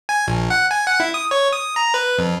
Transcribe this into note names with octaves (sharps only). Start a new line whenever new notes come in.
G#5
A#1
F#5
G#5
F#5
E4
D#6
C#5
D#6
A#5
B4
F2